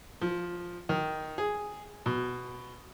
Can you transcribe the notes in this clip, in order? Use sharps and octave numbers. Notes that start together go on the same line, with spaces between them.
F3
D#3
G#4
B2